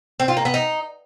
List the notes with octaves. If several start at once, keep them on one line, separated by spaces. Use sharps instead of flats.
C4
F4
A#3
B3
D#4